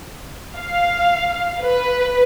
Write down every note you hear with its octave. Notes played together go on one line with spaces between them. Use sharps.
F5
B4